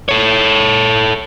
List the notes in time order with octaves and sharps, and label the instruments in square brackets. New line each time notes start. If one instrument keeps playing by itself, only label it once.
[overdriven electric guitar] A4 C#5